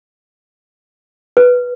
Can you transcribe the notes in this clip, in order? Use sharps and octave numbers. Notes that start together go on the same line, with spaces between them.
B4